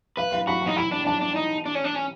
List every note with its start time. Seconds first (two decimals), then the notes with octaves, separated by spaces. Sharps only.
0.17 B4 F5
0.32 F5
0.47 F#4 B5
0.62 B5
0.67 D#4
0.76 E4 B5
0.92 D4
1.06 D4 A5
1.21 D4
1.36 D#4
1.66 D4
1.75 C#4
1.84 D4
1.95 C#4